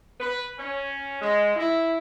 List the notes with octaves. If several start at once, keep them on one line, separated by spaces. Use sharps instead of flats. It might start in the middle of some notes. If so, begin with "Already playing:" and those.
B4
C#4
G#3
E4